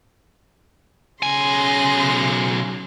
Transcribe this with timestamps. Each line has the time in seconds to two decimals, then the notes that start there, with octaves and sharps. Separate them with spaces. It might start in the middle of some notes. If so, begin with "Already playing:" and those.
1.23 B1 C#3 G#5 C6 A#6